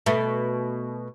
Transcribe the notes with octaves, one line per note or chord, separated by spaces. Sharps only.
B2 A3